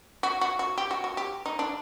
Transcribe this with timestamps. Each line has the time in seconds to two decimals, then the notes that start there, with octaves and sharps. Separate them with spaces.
0.23 F#4
0.41 F#4
0.59 F#4
0.78 G4
0.91 F#4
1.04 F#4
1.17 G4
1.46 D#4
1.59 D4